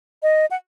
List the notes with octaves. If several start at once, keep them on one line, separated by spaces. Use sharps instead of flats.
D#5
F#5